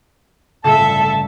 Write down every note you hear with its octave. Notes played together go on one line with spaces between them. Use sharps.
G1 A2 C#3 A4 E5 A5